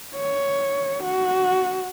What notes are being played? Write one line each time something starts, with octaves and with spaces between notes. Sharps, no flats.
C#5
F#4